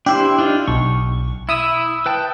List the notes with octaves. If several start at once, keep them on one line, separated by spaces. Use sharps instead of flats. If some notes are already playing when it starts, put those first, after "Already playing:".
D4 E4 G4 C5
D4 D#4 F4
B1 C#6
E4 E5 D#6 E6
B4 G5 A5